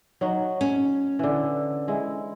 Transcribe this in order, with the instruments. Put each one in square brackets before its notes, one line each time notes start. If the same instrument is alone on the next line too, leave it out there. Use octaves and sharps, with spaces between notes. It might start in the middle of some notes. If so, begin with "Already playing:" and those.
[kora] F#3 D#4 F#4
[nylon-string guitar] C#4
[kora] D3 E3
G#3 E4